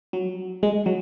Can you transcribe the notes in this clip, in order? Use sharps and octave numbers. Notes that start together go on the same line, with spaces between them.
F#3
G#3
F#3